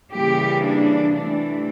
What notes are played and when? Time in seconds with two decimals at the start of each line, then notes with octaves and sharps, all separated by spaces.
0.13 C#3 E3 G3 A#3 G4
0.63 D4
1.14 C3 E3 A3 D4